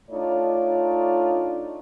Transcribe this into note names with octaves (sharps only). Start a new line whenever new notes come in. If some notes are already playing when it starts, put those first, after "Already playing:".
A3 D4 D#4 F4 C#5 D5